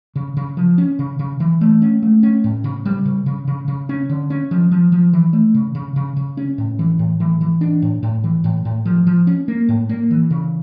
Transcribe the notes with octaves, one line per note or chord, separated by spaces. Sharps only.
C#3
C#3
F3
C#4
C#3
C#3
E3
A3
C#4
A3
C#4
A2
C#3
G3
C#3
C#3
C#3
C#3
C#4
D3
C#4
F3
F3
F3
E3
A3
C#3
C#3
C#3
C#3
C#4
A2
E3
A2
E3
E3
D4
A2
A2
E3
A2
A2
F3
F3
C#4
A#3
A2
A#3
E3
C#3